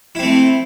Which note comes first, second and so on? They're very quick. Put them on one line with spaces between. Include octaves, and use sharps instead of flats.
E4 C4 A3